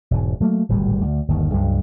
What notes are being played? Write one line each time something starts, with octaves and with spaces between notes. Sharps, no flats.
E1 G#2
F#3 A3 A#3
D1 G#1 A#2 G3
D2
G1 D#2 D#3
C#2 G2 F#3 G#3